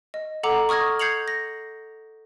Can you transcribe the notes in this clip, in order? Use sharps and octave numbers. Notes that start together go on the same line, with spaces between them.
D#5
A4 F#5 A#5 D6
C#6 D#6 F6 G#6 A#6
G6 G#6 C7 C#7 F7 F#7
A#6